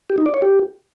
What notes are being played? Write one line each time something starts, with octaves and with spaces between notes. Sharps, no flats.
G4
D#4
D5
C#5
G4